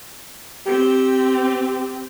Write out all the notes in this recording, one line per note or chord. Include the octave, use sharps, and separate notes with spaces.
C4 G4